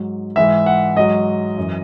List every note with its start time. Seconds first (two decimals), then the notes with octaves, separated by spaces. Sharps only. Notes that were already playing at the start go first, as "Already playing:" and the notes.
Already playing: G#2 F#3
0.36 G#2 E3 E5
0.66 F#5
0.96 G#2 F#3 D#5
1.58 F#2 E3